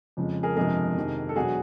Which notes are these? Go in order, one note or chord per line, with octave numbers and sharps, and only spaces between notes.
F2 C#3 F3 G#3
G#4 A#4
G1 F2 C3 F3 G#3 G#4 A#4
F2 C3 D#3
A4
E1 B2 F#3 F#4 G#4